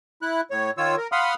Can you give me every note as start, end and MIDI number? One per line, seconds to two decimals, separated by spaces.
0.22 0.41 64
0.22 0.41 90
0.51 0.71 45
0.51 0.71 73
0.78 0.95 51
0.78 0.95 65
0.78 0.95 73
0.78 0.95 88
0.97 1.07 70
1.12 1.34 77
1.12 1.34 78
1.12 1.34 83
1.12 1.34 84
1.12 1.34 87
1.12 1.34 89